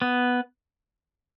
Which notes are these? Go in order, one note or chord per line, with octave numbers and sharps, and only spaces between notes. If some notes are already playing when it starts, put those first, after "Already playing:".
B3